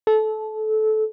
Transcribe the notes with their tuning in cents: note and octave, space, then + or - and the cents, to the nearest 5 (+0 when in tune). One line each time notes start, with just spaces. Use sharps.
A4 -20